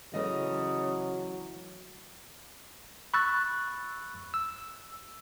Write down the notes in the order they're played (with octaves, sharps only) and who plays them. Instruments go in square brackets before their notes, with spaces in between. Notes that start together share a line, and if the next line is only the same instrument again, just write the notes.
[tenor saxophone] C#3 [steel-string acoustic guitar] E3 A3 D#5 [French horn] F#3
[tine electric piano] B5 C#6 E6 F#6 A6
E6